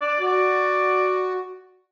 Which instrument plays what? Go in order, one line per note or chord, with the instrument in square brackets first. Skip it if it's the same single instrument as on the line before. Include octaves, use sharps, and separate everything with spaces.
[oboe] D5
[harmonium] F#4 [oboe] D5